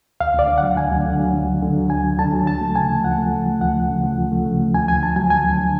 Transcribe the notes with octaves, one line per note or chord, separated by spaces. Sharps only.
D2 F5
D2 D5
D3
F#3 F#5
D2 G#5
D2
D3
F#3
D2
D2
D3
F#3
D2 G#5
D2
D3 A5
F#3
D2 A5
A3
C#3 G#5
F3
D2 F#5
A3
C#3
F3
D2 F#5
A3
C#3
F3
D2
A3
C#3
F3
D2 G#5
D2 G#5
D3 A5
F#3 G#5
D2 G#5
D2
D3